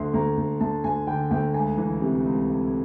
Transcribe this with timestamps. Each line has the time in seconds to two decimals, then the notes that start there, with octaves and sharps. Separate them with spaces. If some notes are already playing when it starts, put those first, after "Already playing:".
Already playing: D2 D3 C6
0.13 D2 A#5
0.37 D2
0.60 D2 A5
0.84 D2 G#5
1.07 D3 G5
1.31 D2 G5
1.54 C#2 G#5
1.77 E3
2.01 C3
2.25 C#2
2.48 C#2